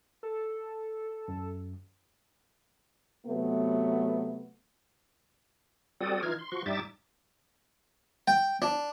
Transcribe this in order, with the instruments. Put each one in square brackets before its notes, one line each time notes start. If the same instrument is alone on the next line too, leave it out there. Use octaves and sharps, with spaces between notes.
[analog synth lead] A4
[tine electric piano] F#2
[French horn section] C3 F#3 A3 B3
[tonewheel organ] G3 C4 F#4 A4 D5 D#6
E3 D#4 F4 F6 G#6
C6
F3 F#4 C6 C#6
G2 G3 D#4 E5 D6 A6
[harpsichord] G5
D4